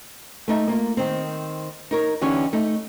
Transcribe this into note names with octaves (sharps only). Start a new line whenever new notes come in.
A3 D#4 E5
A#3 F4
D#3 C4
D#4 A#4 C#5
D3 E3 C#4 D#4 G4 C#5
A3 D#4